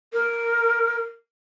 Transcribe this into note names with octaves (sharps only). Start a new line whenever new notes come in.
A#4